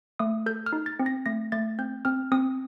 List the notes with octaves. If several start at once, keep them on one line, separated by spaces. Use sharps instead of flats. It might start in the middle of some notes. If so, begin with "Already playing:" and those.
A3 D#6
A4 G6
F6
D#4
A6
C4
A#6
A3 A#6
A3 A6
C4 G6
C4 F6
C4 D#6